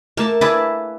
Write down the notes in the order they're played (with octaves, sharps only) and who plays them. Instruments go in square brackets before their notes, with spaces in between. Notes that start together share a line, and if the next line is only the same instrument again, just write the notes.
[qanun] A3 A5 [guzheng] A#3
[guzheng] E4 G#4 D5 [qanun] B4 A5